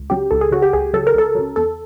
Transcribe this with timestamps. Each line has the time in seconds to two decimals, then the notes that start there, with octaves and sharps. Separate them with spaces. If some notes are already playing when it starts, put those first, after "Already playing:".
Already playing: C#2
0.10 C#3 F#3 G4
0.31 C#2 A4
0.41 G#4
0.51 C#3 F#3 F#4
0.62 G4
0.73 C#2 G#4
0.94 C#3 F#3 A4
1.07 A#4
1.15 C#2 A4
1.35 C#3 F#3
1.56 E2 A4